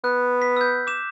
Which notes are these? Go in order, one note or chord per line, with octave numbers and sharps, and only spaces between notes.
B3 F#6
B6
E6 G6
D6 E7